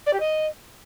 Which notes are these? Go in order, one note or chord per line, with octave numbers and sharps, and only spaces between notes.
D5
G4
D#5